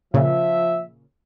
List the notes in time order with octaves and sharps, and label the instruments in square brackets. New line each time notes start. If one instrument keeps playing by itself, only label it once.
[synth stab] A#2 C#3 [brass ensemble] F3 E5